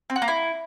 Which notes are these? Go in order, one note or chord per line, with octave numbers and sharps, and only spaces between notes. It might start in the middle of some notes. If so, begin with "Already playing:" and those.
C4
F#4
A#3
E4